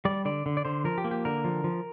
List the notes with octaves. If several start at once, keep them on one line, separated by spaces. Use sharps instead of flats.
G3 D5
D3 D5
D3
D5
D3 C5
F3 A#4
G4
A#3
G4
D3 A#4
F3
F3